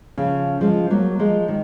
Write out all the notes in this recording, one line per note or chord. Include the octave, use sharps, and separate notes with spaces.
C#3 F3
F3 G#3
F#3 A#3
F3 G#3
D#3